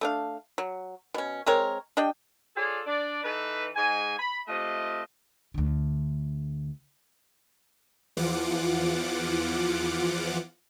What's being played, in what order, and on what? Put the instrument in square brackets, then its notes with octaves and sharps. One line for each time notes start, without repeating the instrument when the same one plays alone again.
[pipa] A3 D4 F5
F#3
B2 C#4
G#3 C4 A#4 C#5
D4 G4 D#5 G5
[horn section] F4 G#4 A4 C#5 D5
D4 D5
E3 D#4 A4 B4
G#2 G#3 G#5
B5
C3 A3 F4 D#5
[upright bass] D2 D3
[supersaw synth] E2 E3 F3 F4 F#5 D6